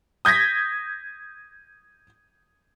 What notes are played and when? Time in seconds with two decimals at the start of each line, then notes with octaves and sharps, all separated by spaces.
0.25 D#6 G6 G#6 A#6 B6